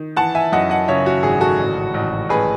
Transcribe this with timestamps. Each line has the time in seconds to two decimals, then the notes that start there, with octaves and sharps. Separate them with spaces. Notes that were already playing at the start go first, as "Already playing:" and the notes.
Already playing: D#3
0.17 E3 F#5 A5
0.35 E5 G#5
0.52 F#2 D#5 F#5
0.70 D#5 F#5
0.88 C#3 C#5 E5
1.06 F#4
1.23 G#1 G#4
1.41 F#4 A4
1.59 A1
1.94 A1
2.29 A1 G#4 B4